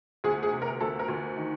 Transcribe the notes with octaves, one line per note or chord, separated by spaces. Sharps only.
D2 G#4
G#4
C3
A#4
D2 A4
A#4
D2
D#3